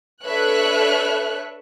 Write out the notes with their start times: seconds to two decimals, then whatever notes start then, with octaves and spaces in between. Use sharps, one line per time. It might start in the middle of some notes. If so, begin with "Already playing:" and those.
0.24 D4 A4 B4 C#5 E5 F#6